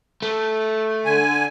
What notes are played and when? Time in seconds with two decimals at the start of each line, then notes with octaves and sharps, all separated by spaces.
0.22 A3
1.05 D3 G#5